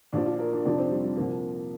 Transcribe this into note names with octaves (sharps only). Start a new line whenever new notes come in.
A#1 A#2 F3 D4
F4
A#4
D4
F1 F2 C3 F3 D4
C4
G3
G3
C2 A#2 F3 A#3